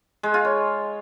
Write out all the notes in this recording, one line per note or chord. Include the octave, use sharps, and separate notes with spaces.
G#3
F4
C#5